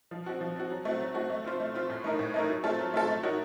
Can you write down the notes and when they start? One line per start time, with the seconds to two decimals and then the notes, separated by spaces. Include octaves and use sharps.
0.11 F3
0.26 C4 F#4
0.41 F3
0.56 C4 F#4
0.70 F#3
0.85 A3 C4 F#4
1.00 F#3
1.15 A3 C4 F#4
1.30 A3
1.44 C4 F4 C5
1.60 A3
1.74 C4 F4 C5
1.90 A2
2.04 A3 D#4 A#4
2.19 A2
2.34 A3 D#4 A#4
2.49 F#3
2.64 A3 C4 F4 A4
2.79 F#3
2.94 A3 C4 F4 A4
3.08 A3
3.23 D#4 F#4 A#4 C#5